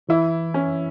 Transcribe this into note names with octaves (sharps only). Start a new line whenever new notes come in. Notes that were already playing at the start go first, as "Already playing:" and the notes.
E3 E4
C#4